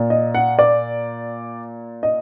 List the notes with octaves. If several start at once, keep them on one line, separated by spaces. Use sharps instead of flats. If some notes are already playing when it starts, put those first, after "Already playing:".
Already playing: A#2
D#5
F#5
D5
D#5